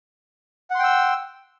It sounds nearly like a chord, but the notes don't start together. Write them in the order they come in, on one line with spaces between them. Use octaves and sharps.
F#5 C6 G5 E6